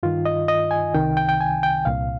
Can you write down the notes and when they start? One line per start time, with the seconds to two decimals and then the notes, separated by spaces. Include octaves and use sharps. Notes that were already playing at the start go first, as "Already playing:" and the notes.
0.03 G2 D#3 F4
0.26 D#5
0.48 D#5
0.71 G#5
0.94 C2 C3 D#3 G5
1.17 G5
1.29 G5
1.41 G#5
1.63 G5
1.85 C2 A#2 F5